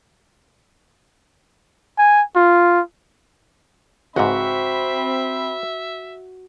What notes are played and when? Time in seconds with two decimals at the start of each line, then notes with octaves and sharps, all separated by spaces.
1.99 G#5
2.36 F4
4.16 C#2 G#2 C4 F#4 E5 B5